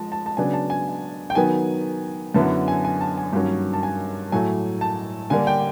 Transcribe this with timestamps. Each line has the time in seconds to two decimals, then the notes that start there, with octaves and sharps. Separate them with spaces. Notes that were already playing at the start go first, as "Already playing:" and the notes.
Already playing: F3 G#3 A5
0.12 A5
0.26 A5
0.37 C#3 F#3 B3 D4 G#5
0.53 A5
0.70 G#5
1.30 G5
1.35 D#3 F#3 B3 G#5
2.34 F#2 D3 F#3 B3 E4 A5
2.68 G#5
2.85 G#5
3.01 A5
3.17 G#5
3.33 G2 D#3 F#3 A#3 C#4
3.73 A5
3.83 G#5
4.32 A2 F#3 A3 G#5
4.81 A5
5.30 D3 G3 A#3 D4 G#5
5.47 G5